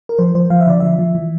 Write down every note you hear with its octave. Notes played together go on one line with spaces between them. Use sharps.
A#4
F3 C5
F3 C5
F3 F5
E5
D3 D5
F3 E5
F3
E3